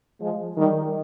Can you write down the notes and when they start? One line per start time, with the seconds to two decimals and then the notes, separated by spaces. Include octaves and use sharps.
0.20 F3 G#3
0.57 D#3 G3